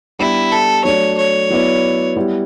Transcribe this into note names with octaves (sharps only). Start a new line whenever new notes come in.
G3 B3 D4 E4 G4
A4
F#3 A3 D4 C#5
C#5
F#3 B3 E4 B4 D5
G3 B3 E4